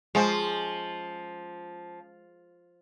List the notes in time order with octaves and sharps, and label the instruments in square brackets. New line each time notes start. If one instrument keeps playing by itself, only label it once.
[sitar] F3 [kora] G#3 C#4 C5